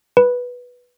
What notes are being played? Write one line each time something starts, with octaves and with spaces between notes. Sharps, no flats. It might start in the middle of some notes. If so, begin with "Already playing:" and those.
B4